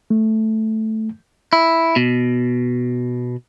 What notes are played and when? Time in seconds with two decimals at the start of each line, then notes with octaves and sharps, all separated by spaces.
0.10 A3
1.53 E4
1.96 B2